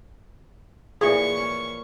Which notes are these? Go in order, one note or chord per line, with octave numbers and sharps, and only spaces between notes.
A#2 E3 F3 G#4 C#6
C#4